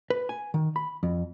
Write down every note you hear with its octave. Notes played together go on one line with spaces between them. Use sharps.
B4
G#5
D#3
B5
F2